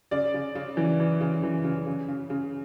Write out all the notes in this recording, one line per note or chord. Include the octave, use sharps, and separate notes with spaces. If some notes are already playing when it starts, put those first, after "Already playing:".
C#3 D5
C#3
C#3
E3
E3
C#3
E3
C#3
C#3
C#3
C#3